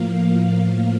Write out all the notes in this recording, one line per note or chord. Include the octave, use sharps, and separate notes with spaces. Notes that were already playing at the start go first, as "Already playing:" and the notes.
Already playing: A2 F3 A#3 F5